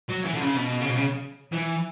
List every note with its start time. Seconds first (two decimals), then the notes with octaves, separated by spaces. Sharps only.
0.09 F#3
0.25 E3
0.33 D3
0.41 C#3
0.57 B2
0.81 C#3
0.89 B2
0.96 C#3
1.53 E3